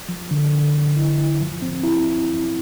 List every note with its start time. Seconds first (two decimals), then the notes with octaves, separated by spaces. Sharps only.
0.09 F3
0.31 D3
0.53 D3
0.74 D3
0.96 E4
1.18 E4
1.40 F3
1.62 C4
1.84 E4